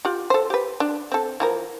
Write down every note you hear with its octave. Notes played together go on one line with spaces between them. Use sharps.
F4 G4
A4 C5
G4 B4
D4
C4 A4
E3 F3 A#4